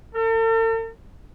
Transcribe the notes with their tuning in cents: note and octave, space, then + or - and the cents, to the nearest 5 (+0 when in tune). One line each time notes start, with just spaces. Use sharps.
A4 +45